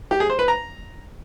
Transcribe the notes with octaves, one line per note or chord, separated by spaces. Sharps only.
G4
G#4
C5
B4
A#5